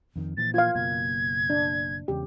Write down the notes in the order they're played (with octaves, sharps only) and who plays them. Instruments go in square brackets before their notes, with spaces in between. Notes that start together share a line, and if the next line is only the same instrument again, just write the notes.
[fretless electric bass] F2 D#3
[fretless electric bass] A#2 E3 F3 [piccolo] A6
[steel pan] F4 F5 [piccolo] G#6
[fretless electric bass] F#1 B2 A#3 [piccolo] G#6
[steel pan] D4
[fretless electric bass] E2 C#3 G#3 [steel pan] G4